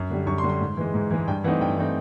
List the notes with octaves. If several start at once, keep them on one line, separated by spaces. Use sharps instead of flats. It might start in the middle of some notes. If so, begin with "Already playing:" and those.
Already playing: F#2
D3 G3
F#2 C#6
C6
D3 G3
C6
G#2
E3 G#3
G#2
E3 G#3
G2 G5
E3 A3 C4 D#4 F#5
G2 G5
E3 A3 C4 D#4